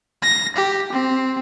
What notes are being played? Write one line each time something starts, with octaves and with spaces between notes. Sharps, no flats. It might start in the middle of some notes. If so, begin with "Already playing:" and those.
A#6
G4
C4